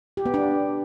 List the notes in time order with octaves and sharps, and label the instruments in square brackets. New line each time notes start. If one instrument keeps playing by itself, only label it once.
[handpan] G4
B3
D4